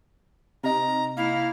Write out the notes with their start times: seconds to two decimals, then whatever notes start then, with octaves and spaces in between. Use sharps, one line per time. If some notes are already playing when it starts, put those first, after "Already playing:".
0.64 C3 D#4 A#5
1.17 A#3 E4 F5